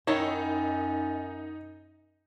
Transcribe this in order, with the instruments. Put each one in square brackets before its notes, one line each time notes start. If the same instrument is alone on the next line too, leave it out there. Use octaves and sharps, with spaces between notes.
[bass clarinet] F#2 [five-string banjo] D#3 E4 C#5 [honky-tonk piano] D#4